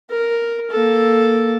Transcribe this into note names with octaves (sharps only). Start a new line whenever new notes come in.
A#4
A#3 A4